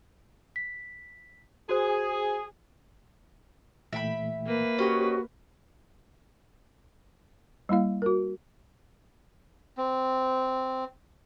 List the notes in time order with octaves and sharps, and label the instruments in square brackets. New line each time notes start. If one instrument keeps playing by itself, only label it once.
[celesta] B6
[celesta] F#4 C5 [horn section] G#4
[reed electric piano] A#2 E3 A3 [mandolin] E5 G5 B5
[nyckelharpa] A#3 B4
[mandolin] C#4 D#5 [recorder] F#4 [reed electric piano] G4 C5
[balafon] G3 A#3 E4 F5
F#4 A#4
[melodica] C4